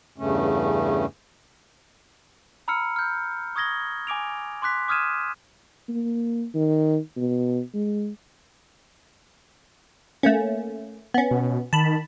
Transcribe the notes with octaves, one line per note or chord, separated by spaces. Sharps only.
E2 G2 C#3 A3 C#4
A#5 B5 E6 F6 C#7
F6 G6
C#6 D#6 G#6 A#6 G7
G#5 D6 D7 F7
C6 D6 F#6 B6
D6 D#6 F6 G#6 D#7 E7
A#3
D#3
B2
G#3
A3 A#3 C#4
B3 C#4
B2
D#3 A5 B5